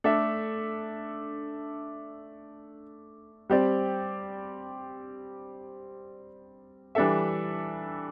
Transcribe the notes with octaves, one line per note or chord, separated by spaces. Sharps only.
A3 D4 A4 E5
G3 C4 G4 D5
E3 G3 D4 A4 E5